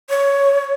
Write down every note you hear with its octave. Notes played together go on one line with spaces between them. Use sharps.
C#5